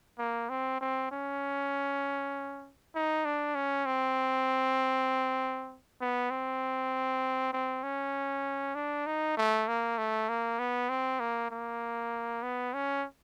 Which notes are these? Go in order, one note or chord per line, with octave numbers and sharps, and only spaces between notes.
A#3
C4
C4
C#4
D#4
D4
C#4
C4
B3
C4
C4
C#4
D4
D#4
A3
A#3
A3
A#3
B3
C4
A#3
A#3
B3
C#4